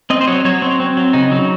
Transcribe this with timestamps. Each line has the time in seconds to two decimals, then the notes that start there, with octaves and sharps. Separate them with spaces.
0.10 C4 D#5
0.21 C5
0.27 F#3 C#5
0.45 F#3 C#5
0.62 C4
0.80 C4
0.97 F#3
1.13 C#3 D#4
1.32 F#3